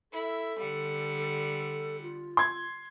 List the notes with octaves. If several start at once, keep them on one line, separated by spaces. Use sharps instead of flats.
E4 A4
D3 G3 F#5
F4
C6 G#6